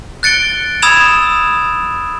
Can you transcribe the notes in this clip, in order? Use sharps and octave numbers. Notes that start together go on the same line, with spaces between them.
F#6 A6 C#7 D7 G7
B5 D#6 E6 G#6 E7 F7